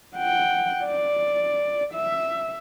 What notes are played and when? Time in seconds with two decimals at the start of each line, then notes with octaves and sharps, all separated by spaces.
0.16 F#5 G5
0.84 D5
1.94 E5